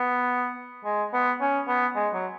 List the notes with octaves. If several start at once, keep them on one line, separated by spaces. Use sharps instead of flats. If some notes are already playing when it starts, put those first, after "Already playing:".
Already playing: B3
G#3
B3
C#4
B3
G#3
F#3